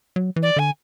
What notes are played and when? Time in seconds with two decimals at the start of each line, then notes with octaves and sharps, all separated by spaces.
0.16 F#3
0.36 E3
0.42 D5
0.56 D3 G#5